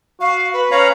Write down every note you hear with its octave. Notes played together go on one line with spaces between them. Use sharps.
F#4 F5
B4
C#4 C#5 F5 A#5